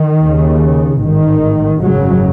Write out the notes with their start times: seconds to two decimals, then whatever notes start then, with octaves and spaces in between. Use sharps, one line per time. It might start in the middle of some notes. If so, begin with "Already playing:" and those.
Already playing: D#3
0.21 D#2 C#3
1.00 A1 G#2 D#3
1.80 G#1 F#2 C#3 F#3